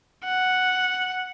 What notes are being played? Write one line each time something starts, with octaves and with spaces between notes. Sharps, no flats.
F#5